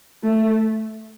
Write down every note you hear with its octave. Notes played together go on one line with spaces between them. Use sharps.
A3